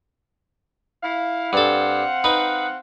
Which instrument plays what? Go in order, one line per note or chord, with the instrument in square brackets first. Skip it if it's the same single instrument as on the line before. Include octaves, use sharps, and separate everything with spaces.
[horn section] E4 F5
[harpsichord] G2 A4 [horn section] C4 F5 F#5
[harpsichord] D#4 B4